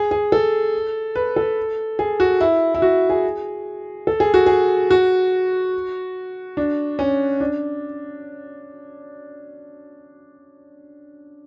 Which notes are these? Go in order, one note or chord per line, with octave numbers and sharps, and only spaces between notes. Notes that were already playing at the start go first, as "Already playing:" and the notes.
Already playing: G#4
G#4
A4
B4
A4
G#4
F#4
E4
E4
F#4
G#4
A4
G#4
F#4
G#4
F#4
D4
C#4
D4